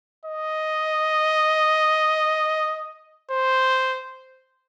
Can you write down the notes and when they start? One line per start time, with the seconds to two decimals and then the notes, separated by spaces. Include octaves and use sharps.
0.26 D#5
3.31 C5